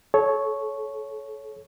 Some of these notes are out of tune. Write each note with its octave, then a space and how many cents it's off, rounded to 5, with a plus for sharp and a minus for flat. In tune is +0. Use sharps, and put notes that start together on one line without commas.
A4 -30 C#5 +0